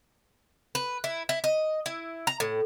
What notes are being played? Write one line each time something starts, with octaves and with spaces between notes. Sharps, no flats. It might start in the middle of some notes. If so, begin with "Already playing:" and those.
B4
E4
E4
D#5
E4
A#5
A2